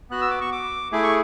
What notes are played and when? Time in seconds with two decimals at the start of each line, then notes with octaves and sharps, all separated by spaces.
0.10 B3 F#4 F#6
0.21 E6
0.31 D6
0.41 C#6
0.52 D6
0.92 A3 E4 G#4 D6
1.03 C#6